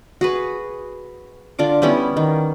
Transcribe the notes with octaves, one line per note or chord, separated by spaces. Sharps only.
F#4 G#4 B4
D3 D4 F4 D6
G3 B3 C#4 E4
D#3